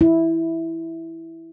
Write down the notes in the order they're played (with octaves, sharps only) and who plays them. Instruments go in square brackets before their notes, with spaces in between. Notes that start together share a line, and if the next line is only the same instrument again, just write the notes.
[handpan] E4